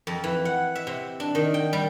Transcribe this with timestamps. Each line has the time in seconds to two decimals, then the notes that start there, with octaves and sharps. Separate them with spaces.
0.07 F2
0.24 E3
0.45 F#5
0.75 E5
0.87 C3
1.20 D4
1.35 D#3
1.54 G5
1.73 G3